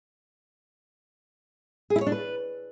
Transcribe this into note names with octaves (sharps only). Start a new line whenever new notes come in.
G#4
E4
C#5
D4
B4